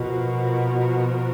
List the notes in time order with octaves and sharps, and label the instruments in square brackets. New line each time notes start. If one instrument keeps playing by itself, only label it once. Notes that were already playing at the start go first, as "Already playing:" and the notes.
Already playing: [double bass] B2 [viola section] F3 B3 F#4 A#4